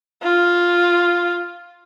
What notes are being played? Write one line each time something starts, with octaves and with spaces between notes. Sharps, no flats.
F4